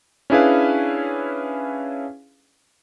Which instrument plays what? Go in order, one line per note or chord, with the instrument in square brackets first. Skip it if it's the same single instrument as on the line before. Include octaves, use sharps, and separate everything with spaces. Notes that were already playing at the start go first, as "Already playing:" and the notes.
[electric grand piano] C#4 D4 E4 G#4 B4 F5